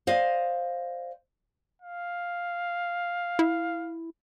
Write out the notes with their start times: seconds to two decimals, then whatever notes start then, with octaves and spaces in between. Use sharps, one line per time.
0.07 C5 D5 D#5 F5
1.82 F5
3.39 E4